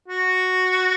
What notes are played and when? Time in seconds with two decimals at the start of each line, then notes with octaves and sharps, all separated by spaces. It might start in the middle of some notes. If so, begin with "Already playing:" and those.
0.08 F#4